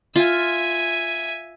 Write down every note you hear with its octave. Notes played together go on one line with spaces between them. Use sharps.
F4 E5 G#5